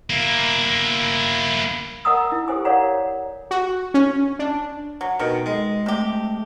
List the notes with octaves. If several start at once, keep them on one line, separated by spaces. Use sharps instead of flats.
A#3 E4
A#4 D#5 F#5 A#5 D#6 E6
E4
G4 A4 C5 G#5 D6
A#4 C#5 D5 F5 F#5 A#5
F#4
C#4
D4
F#3
B2 D#3
G#3
C3 A3 G4